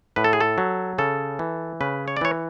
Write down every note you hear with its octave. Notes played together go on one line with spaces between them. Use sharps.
A2 B4
A4
G#4
A4
F#3
C#3 A4
E3
C#3 B4
C#5
D5
E3 C#5